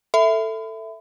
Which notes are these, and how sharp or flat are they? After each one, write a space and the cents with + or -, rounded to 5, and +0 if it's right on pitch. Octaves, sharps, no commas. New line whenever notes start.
A4 +15 E5 +0 B5 +35